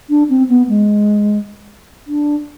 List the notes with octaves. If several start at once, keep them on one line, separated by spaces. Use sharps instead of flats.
D4
C4
B3
G#3
D4